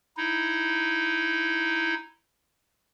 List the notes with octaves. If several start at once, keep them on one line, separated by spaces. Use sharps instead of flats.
D#4 E4